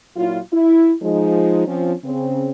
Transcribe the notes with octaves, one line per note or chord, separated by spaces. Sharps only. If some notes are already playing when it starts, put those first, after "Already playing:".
A#2 F#3 E4 F4
E4
F3 G#3 D#4
F3 C4 C#4
C#3 C4